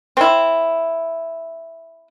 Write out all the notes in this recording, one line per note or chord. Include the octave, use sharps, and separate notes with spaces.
C4 E4